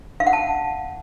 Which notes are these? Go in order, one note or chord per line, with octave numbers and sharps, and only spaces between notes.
F5
F#5
A5